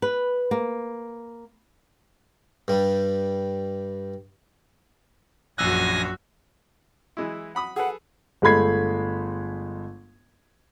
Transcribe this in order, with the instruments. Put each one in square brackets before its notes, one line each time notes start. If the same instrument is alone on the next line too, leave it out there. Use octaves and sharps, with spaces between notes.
[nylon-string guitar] B4
A#3
[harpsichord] G2 G3
[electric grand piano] A#1 E6 F#6 [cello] F#2 F#4 [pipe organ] G#5 A#6
[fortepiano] E3 G#3 E4
F#5 B5 D#6
[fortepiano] G#4 A4 B4 [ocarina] F#5
[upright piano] G1 G#3 A3 B5 G#6 C7